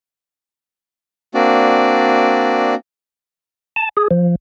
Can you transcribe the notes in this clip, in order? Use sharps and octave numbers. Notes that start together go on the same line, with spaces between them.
A#3 C4 D4 F#4 D5
A5
G#4
F3